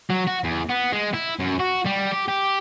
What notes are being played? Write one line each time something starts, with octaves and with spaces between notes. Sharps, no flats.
F#3
F#4
E2
B3
G#3
E4
F#2
F#4
G3
G4
G4